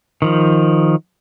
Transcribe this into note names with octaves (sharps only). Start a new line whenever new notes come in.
D#3 F3